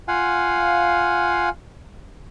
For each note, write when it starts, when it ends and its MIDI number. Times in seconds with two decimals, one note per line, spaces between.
0.08 1.49 65
0.08 1.49 77
0.08 1.49 78
0.08 1.49 80